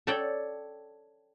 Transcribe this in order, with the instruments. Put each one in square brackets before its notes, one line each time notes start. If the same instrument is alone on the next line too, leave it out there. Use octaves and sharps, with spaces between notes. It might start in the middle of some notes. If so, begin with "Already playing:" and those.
[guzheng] A4 C#5 D5 G5